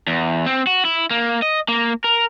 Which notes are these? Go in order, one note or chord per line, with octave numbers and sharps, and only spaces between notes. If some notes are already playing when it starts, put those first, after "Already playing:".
E2
C4
F#4
E4
A#3
D#5
A#3
A#4